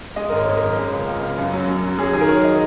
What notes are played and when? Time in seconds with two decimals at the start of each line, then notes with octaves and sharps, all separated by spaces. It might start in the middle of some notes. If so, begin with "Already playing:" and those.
0.16 G#3 D#5
0.30 G#1 A#4
0.37 C#5
0.48 G#1
0.57 A#4
0.63 F#2
0.78 G#3
0.93 C#2
1.08 C#2
1.23 C#3
1.38 F#2
1.53 F#3
1.68 F#2
1.83 F#3
1.99 F#3 G#4
2.13 D#3 G#4
2.21 A#4
2.28 D#3 C#5
2.44 D#5